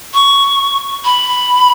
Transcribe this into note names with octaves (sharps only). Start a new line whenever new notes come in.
C#6
B5